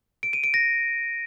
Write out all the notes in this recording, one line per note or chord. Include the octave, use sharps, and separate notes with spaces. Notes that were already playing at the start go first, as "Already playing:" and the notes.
D7
D#7
D7
A#6